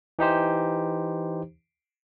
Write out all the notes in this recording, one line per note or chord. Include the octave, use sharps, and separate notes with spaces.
E3 D#4 G4 C5